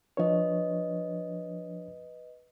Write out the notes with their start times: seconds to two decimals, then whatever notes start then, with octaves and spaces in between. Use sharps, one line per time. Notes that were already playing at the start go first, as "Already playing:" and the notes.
0.17 F3 D4 B4 C#5 D#5